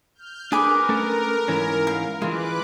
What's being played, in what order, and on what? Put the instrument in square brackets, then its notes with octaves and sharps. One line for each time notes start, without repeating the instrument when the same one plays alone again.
[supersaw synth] F6 G6
[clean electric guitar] D4 G#5 [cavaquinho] G#4 B4 D6 [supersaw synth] A#4
[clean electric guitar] A3 C#4 A4
G#2 E3 C#4
[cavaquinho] F5
[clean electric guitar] E3 G#3 [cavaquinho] F4 [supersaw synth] B4 D6 F#6